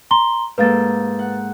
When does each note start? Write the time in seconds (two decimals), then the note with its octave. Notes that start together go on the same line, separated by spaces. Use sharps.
0.11 A#5 C6 G7
0.58 G#2 A#3 A4 B4 F5 A6
1.19 F#5